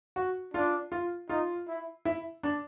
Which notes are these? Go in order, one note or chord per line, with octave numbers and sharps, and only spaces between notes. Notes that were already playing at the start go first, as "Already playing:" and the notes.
F#4
D4 F4
F4
D#4 F4
E4
E4
D4